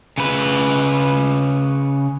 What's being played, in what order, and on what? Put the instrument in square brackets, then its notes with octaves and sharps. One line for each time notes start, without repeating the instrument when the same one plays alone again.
[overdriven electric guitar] C#3 B4